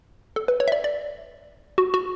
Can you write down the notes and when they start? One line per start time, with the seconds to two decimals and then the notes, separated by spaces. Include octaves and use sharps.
0.36 A4
0.48 B4
0.60 C#5
0.68 E5
0.72 D5
0.84 D5
1.78 F#4
1.94 F#4